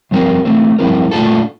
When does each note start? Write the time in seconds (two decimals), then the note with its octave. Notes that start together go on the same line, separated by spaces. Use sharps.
0.11 G2 F3 C4 G4 A#4
0.45 E3 A3 C4
0.79 G2 F3 C4 E4 A#4
1.11 A#2 A3 D4 F4 A4